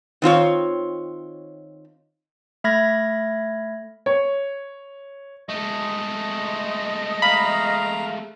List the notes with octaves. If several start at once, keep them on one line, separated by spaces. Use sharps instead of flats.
D#3 C4 F4 C#5
A3 E5 B5 F6 G#6 A#6
C#5
G#3 A3 D#5
F5 A#5 B5